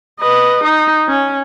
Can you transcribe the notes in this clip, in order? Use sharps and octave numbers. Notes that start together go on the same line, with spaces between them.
B4 D#5
D#4
C#4